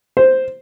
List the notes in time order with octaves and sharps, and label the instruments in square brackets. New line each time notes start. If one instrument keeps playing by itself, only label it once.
[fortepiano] C5